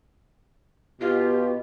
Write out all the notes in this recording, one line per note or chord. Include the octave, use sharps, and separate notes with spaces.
B2 F4 G4